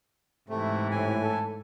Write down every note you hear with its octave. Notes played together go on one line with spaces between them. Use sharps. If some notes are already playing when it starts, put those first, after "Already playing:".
G#2 C3 E3 A3
A2 G#5
A4